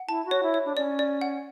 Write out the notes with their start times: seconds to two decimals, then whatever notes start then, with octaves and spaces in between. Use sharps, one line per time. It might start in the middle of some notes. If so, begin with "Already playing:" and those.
Already playing: F#5
0.09 E4 A5
0.26 F#4
0.31 C#5
0.43 E4
0.54 C#5
0.65 D4
0.77 C#4 D5
0.99 D5
1.21 F#5